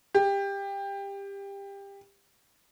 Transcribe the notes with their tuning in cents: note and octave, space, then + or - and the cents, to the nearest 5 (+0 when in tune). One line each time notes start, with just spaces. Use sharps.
G4 +20